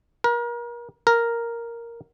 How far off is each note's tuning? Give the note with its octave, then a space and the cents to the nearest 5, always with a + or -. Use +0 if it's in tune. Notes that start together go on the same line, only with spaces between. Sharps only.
A#4 +35
A#4 +0